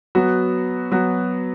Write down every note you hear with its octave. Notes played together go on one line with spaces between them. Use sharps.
F#3 B3 F#4
F#3 B3 F#4